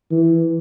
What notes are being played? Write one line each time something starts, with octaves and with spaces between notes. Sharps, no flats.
E3